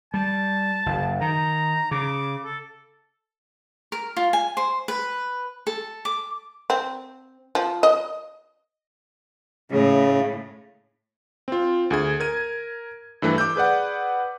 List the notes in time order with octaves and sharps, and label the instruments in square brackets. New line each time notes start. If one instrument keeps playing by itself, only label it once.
[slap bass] G3 [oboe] A5
[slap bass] F#1
[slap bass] D#3 [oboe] A#5
[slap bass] C#3 [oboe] D6
[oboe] A4
[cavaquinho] A#4
F4
G#5
C5
B4
A4
D6
[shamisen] C4
F3
D#5
[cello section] A2 [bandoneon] C#3
[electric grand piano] C4 F4
D2 G#4 G#6
A#4 G#6 D#7
G2 E3 A3 B4
D6 E6 G6
G#4 B4 D5 F#5